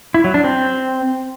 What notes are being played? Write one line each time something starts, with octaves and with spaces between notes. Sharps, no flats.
E4
F#3
D4
C4